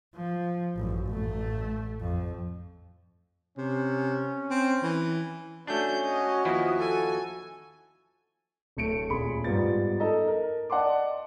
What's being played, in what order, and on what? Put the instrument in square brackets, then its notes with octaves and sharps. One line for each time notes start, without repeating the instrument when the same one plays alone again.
[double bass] F3
A1 F#2
A1 A3
F2
[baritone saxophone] C3 [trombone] C#4
[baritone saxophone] C4
E3
[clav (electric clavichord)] A3 D4 [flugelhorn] C#4 [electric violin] F#4 G6
[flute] F#4 [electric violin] D#5
[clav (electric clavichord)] D#2 F3 E4 [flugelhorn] B3
[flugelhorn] A4 [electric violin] G#5
[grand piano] D1 A3 C#7 D7
D#1 G#4 B5 C6
G#2 G3 B3 F4 A6
D#4 A4 D#5 A#5
A#4
D5 D#5 F#5 A5 C6 D6